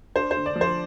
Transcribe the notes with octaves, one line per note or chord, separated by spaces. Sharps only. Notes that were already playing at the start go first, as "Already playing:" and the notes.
D4 C5
C5
D3
D5
F3
C5